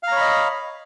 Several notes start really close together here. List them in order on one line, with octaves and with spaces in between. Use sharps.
F5 A#5 C#5 B5 D#5